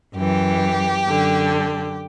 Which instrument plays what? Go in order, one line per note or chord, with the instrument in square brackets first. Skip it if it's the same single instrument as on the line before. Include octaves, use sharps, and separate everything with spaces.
[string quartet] F#2 E3 G4
F#2 D3